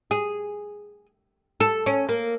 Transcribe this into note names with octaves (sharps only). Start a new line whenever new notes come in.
G#4
A4
C#4
A#3